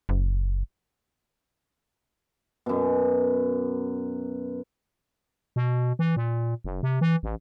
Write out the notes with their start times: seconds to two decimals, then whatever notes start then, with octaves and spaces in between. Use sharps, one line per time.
0.09 F#1
2.66 F#2 B2
5.56 B2
5.99 E3
6.16 A#2
6.64 F#1
6.83 C3
7.01 E3
7.23 A1